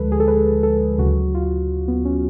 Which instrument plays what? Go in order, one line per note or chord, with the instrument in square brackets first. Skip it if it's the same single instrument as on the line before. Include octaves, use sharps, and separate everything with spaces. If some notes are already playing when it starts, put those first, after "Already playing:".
Already playing: [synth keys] D2 D3 F3 G#3 A4 B4
G#4
A4
B4
A4
D2 C#3 F#3 F#4
F4
B3
C#4